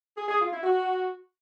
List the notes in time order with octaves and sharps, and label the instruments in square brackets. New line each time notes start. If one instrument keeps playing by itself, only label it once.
[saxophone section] G#4
G#4
F4
E4
F#4